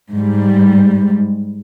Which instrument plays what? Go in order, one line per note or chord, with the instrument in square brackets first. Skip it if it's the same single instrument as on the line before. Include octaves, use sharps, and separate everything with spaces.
[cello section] G#2 G3